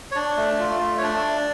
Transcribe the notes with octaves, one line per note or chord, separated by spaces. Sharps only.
C#5
D4 D5
A3
F4
A3
C#5
D4 D5